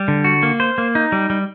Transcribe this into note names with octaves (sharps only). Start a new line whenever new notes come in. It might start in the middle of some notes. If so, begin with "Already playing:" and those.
Already playing: G3
D3
F#4
A#3
C5
A#3
D#4
G3
G3